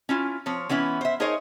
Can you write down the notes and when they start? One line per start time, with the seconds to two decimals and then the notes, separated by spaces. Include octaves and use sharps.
0.09 C#4 E4 F4
0.46 F3 C4 C#5
0.69 E3 B3 C#4 E4
1.01 C5 E5
1.20 D#4 G#4 A#4 C5 C#5 D#5